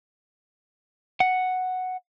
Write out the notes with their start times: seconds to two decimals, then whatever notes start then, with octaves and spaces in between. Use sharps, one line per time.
1.20 F#5